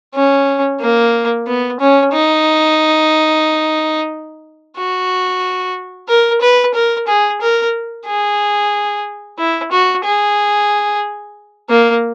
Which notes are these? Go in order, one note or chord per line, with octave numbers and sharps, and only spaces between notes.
C#4
A#3
B3
C#4
D#4
F#4
A#4
B4
A#4
G#4
A#4
G#4
E4
F#4
G#4
A#3